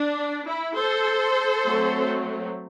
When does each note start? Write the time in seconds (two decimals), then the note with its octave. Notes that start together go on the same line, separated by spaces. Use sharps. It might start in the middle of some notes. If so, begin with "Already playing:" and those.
Already playing: D4
0.47 E4
0.76 A4 C5
1.64 F#3 A3 C4